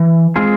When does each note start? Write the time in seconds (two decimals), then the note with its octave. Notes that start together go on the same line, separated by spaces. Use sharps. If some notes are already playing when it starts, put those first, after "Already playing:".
Already playing: E3
0.36 G#3 C4 F4 G#4